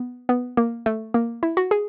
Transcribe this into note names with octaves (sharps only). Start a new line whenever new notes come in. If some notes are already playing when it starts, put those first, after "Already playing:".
Already playing: B3
B3
A#3
A3
A#3
E4
F#4
G#4